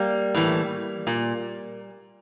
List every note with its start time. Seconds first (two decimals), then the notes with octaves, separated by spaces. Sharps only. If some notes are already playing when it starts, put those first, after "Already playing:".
Already playing: G3 A#3
0.34 A2 E3
1.07 A#2